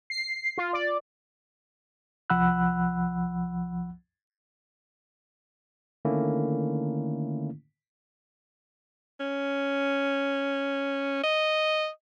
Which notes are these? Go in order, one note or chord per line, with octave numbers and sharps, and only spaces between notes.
C7
F4
D5
C2 F3 F#5 B5 E6 F#6
D3 D#3 A3 A#3 C#4 E4
C#4
D#5